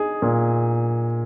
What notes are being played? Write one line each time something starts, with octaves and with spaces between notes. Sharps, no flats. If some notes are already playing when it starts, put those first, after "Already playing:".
Already playing: D#4 G#4
A#2